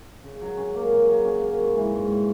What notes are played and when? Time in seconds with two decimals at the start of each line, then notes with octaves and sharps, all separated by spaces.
0.24 C#3
0.41 F#3
0.57 C#4
0.75 A#3
0.91 C#3
1.09 F#3
1.24 C#4
1.42 A#3
1.58 G#2
1.76 E3
1.91 G#2
2.08 G3